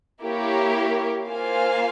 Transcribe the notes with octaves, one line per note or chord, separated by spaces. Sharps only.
A#3 E4 G4 A#4 C#5
A#3 F4 C5 F5 G#5